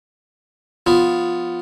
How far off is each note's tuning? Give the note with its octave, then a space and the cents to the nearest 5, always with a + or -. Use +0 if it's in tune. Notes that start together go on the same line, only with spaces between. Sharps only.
F3 +5 B3 +10